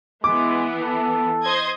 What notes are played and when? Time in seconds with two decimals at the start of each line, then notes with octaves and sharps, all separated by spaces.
0.24 E3 G#3 B3 D6
0.82 A4
1.43 C5 D#5 G#6